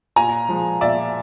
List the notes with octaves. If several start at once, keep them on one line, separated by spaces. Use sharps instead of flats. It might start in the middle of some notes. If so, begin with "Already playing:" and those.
A#2 G#5 A#5
F3 G#3
A#2 D5 E5